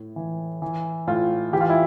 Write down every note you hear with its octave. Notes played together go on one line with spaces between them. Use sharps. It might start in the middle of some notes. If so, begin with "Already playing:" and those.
Already playing: A2
E3
E3
A2 F4
E3 G4
F4
E4